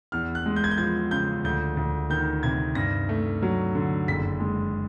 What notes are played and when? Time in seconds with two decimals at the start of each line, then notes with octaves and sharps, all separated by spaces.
0.12 E2 F6
0.35 F#6
0.46 G#3
0.56 G6
0.64 G#6
0.71 G6
0.78 F3 G#6
1.11 C#3 G6
1.44 D2 G6
1.77 D2
2.10 D#3 G6
2.43 C3 G#6
2.75 G2 A#6
3.09 A3
3.42 F#3
3.75 D3
4.08 F#1 B6
4.40 G#3